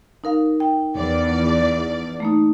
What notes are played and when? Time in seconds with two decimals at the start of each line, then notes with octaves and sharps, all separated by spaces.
0.24 D#4 A#4 F5
0.60 G5
0.96 E2 D5
2.20 A3 A#3 D#4